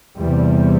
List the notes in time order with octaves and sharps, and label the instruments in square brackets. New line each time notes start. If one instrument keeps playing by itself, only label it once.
[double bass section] E2 C3 G3